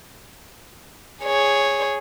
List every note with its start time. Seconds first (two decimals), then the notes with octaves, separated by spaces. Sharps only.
1.23 G#4 C#5